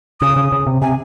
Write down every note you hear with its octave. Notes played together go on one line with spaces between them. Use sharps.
C#3 D#6
C#3
C#3
C3
C3 G#5